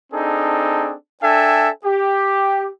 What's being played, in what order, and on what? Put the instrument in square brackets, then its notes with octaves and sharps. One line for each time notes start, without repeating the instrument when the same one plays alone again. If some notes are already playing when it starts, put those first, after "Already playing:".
[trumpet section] C4 D4 D#4 G#4 A4
D4 A4 E5 G5 G#5
G4